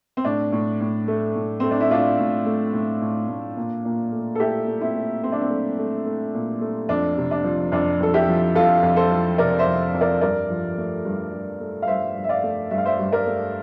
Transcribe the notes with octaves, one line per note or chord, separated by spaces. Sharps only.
C4
A2 D4
A2
A2
A3
A2
A3 C4
D4
E4
A2 D4 F4
A2
A3
A2
A2
A2
A#2
A#2
A3
A4
A3 E4 G4
A3
C4 E4
A3
A3 C4
D4
C4
A3
A3
A3
A#2
A3
F2 D4
C3
D4
F3
F2 D4
F2 A4
E4 G4
F3
F2 F4 A4
F2
A4 C5
F3
C3 A#4 D5
C5 E5
F2
F2
A#4 D5
G2 A#4 D5
F3
A3
G2
G2
A3
F5
G2 C5 E5
G2
E5
D5 F5
A3
G2 E5
F5
C5 E5
G2
A#4 D5
A3